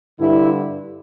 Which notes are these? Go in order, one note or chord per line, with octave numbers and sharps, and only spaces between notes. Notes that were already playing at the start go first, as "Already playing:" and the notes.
G2 D3 E4